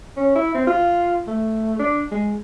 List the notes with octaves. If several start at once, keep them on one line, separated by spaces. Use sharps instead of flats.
C#4
E4
C4
F4
A3
D4
G#3